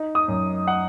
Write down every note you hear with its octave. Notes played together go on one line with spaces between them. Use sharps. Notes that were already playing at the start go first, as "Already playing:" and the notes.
Already playing: D#4
D#6
F#2
F#5